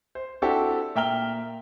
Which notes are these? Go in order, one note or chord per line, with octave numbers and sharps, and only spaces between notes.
C5
C4 D4 E4 F#4 G4 A4
A#2 E5 G5 A#5 F6 G7